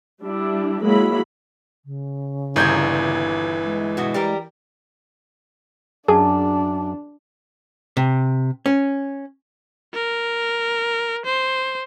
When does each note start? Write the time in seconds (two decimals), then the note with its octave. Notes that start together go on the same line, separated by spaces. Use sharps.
0.21 G3 D4 E4
0.82 F#3 G#3 A#3 E4 B5
1.84 C#3
2.56 G1 A#2 D#3 E3 G3 G6 G#6
3.64 G#3
3.97 B2 F#4
4.14 G3 G4 A#4
6.08 F#2 D4 G#4 A5 D6
7.97 C3
8.66 C#4
9.94 A#4
11.26 C5